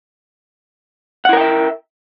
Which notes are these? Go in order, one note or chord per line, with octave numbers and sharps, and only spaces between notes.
E4 A#4 E5 F#5 G5